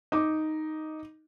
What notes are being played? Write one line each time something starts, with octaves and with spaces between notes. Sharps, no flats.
D#4 D6